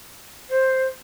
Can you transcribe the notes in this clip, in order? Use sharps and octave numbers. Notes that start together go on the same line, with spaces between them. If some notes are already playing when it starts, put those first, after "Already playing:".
C5